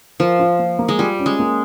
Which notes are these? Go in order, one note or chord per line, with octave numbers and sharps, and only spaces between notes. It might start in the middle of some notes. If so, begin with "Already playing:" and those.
F3 A#4
F4
A#3
A#3
G#3
G3 F4
C#4
G#3
A#3